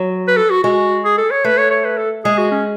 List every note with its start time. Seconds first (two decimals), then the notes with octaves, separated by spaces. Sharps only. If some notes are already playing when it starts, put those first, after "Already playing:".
Already playing: F#3
0.28 B4
0.37 A4
0.50 F#4
0.63 G#3 F#4
1.04 G#4
1.18 A4
1.31 C#5
1.44 A3 B4
1.58 C#5
1.71 C#5
1.85 B4
1.98 A4
2.25 G#3 G#4
2.38 F#4
2.51 C#4